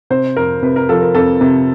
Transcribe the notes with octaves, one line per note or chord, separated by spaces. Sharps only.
C3 C5
F2 A#4
C3 B4
A#4
F3 A4
A#4
F2 A4
C3